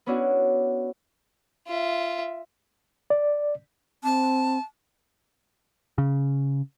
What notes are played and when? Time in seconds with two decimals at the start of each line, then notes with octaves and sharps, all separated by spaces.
0.06 B3 C#4 D4 E4 F#4
1.67 F4 E5
3.10 D5
4.04 C4 A5
5.98 C#3